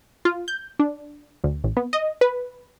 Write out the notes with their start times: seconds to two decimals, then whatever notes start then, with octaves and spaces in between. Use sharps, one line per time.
0.25 F4
0.48 G6
0.79 D4
1.44 D2
1.64 A1
1.77 B3
1.93 D#5
2.21 B4